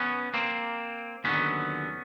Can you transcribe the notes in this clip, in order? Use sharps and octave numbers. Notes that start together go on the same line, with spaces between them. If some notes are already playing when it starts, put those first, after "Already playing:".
Already playing: B3 C#4
A#3 C4
D#2 D3 F#3 B3 C#4